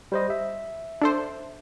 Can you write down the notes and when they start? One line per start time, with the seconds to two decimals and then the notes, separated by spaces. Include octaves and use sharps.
0.12 G3 C5 D#5
0.30 E5
1.02 D4 A4 C5